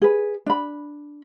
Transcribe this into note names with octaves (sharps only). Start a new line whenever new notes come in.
G#4 B4
D4 B5